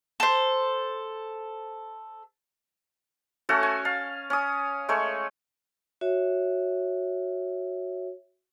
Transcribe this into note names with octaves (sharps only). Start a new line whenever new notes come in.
A4 C5
A3 C#4 F#4 A4
G#5
F5 A5
C#4 D#6
G#3 A3 C#5
F#4 C#5 E5